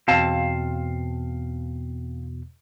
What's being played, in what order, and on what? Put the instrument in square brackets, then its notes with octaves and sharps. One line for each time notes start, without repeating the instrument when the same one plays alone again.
[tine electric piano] E2 B2 [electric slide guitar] C4 F5 A5